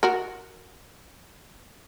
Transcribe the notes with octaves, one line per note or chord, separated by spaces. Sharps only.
F#4 A#4